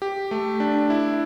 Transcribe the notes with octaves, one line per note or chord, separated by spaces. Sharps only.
G4
A3
D4
E4